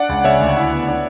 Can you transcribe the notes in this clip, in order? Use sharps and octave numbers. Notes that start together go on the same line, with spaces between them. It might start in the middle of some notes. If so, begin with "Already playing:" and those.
Already playing: D4 D5 F#5
C#2
C#3 C#5 E5
D2
E4
B3
D4